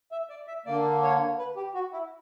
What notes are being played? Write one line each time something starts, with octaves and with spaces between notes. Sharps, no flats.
E5
D5
E5
D3 A#3 D5
C#5
B4
G4
F#4
E4